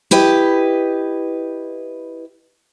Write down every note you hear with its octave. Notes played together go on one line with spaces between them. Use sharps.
E4 G4 B4 D#5